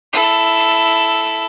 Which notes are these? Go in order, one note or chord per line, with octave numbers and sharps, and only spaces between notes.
E4 A4